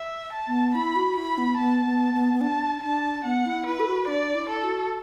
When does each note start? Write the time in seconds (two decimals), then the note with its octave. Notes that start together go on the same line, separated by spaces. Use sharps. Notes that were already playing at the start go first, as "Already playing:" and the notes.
Already playing: E5
0.33 A5
0.47 B3
0.75 E4 B5
0.96 F#4
1.16 E4 B5
1.38 B3
1.58 B3 A5
1.85 B3
2.14 B3
2.33 B3
2.41 D4 A5
2.83 D4 A5
3.25 B3 F#5
3.46 E4
3.67 E4 B4
3.80 A4
3.87 F#4
4.07 D4 D5
4.35 E4
4.49 A4
4.63 F#4